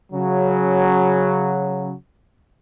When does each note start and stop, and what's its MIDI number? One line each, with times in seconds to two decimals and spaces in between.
0.13 1.92 49
0.13 1.92 54